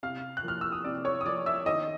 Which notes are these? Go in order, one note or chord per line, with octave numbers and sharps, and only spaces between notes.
C3 F5 F6
F#6
F3 A#3 F6
E6
D#6
C3 D5 D6
C#5 C#6
D#6
F3 A#3 D5 D6
E5 E6
D#3 D#5 D#6